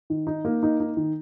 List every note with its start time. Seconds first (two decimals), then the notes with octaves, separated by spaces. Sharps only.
0.10 D#3
0.27 D#4
0.45 A#3
0.63 D#4
0.80 D#4
0.97 D#3